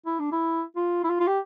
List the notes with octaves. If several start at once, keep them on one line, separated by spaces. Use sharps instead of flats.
E4
D4
E4
F4
E4
F4
F4
G4